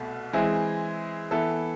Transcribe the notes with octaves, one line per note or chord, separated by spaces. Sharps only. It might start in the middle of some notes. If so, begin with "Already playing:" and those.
Already playing: C2 B2 A3
E3 G#3 C4 E4 G#4
E3 B3 E4 A4